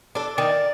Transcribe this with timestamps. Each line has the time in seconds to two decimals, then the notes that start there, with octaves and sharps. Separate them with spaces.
0.15 D4 A4
0.37 D#3 D5